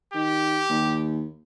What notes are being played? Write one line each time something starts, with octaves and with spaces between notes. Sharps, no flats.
D#3 G4
D#2